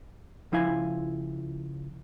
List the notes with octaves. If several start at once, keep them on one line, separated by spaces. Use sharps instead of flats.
C#2 F3 E4 F5 G#5